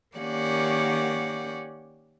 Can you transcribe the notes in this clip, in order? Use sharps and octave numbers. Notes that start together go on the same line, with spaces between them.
D#3 A#3 C#4 G4 D5 F#5